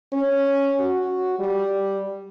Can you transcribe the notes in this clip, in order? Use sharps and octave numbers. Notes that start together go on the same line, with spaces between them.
C#4
F#4
G3